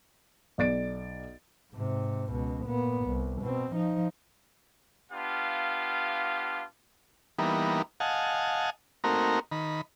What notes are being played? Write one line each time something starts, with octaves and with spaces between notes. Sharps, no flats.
B1 D5 A6 D7
G#2 C3
C#2 B2
A#2 B3
C2
B2 C4
F3 D#4
B3 D4 F4 G4 F5
E3 G3 A#3 B3 D#4
D#5 F5 F#5 G#5 A5
A3 A#3 C4 D#4 F#4 A#4
D#3 B5